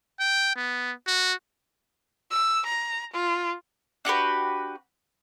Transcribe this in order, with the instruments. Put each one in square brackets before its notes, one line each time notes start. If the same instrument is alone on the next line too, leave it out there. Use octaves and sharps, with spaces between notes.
[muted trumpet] G5
B3
F#4
[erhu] E6
A#5
F4
[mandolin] D4 F#4 G4 B4